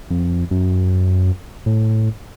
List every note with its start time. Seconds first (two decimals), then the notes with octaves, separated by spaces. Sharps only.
0.10 F2
0.51 F#2
1.66 A2